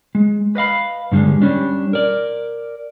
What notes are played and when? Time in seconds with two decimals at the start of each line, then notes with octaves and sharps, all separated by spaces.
0.15 G#3
0.55 B4 D#5 F5 B5
1.12 G2 D3 F3 G3 G#3
1.42 G3 C#4 D4
1.93 A#4 D5